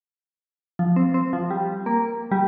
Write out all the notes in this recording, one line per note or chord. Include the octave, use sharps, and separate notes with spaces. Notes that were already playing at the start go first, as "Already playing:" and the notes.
F3
C4
C4
F3
G3
A#3
G3